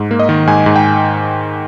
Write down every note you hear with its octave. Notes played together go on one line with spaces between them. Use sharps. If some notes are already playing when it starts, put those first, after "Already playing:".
Already playing: G#2
A#3
D#5
D#3
G#2 G#5
G#2
G5